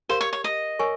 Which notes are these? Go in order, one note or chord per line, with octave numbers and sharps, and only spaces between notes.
G4 A#4 C5 F5
C#5
C#5
D#5
A#4 C#5 G#5 C#6